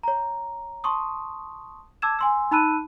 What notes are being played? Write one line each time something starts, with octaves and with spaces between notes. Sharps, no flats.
C#5 A#5
A5 C6 C#6 D#6
A5 D6 E6 G#6 E7
G#5 C6 E6
D#4 A5 B5 E6 F#6 D#7